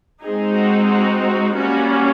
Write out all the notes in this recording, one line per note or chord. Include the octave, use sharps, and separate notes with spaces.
G#3 C4 D#4 G#4
F#4
F#4
F#4
G3 A#3 C#4 F#4